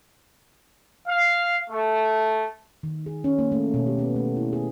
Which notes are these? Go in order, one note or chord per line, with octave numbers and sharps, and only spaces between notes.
F5
A3
D#3
G#4
C#4
A#3
A3
B2
G4
B3
A3
E4
G#4